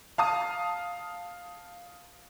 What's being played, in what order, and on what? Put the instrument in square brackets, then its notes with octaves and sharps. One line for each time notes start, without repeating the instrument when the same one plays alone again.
[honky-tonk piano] F5 A5 D#6